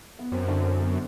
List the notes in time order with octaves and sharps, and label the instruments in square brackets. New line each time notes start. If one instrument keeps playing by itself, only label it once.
[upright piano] B3
[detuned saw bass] F#2 [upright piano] C4
[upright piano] D3 D4
C4
B3